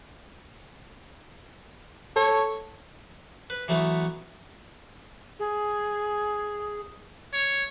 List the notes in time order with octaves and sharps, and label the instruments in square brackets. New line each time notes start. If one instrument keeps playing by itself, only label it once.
[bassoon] A4 [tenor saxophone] C#5
[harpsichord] B4
E3 F#3 A3 B3
[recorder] G#4
[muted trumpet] C#5